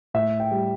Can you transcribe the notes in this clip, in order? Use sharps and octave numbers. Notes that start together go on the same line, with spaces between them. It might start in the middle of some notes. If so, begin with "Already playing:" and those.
A2 E5
G5
G3